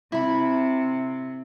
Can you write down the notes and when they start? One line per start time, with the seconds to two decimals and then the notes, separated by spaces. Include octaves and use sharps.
0.12 C3 E4 B5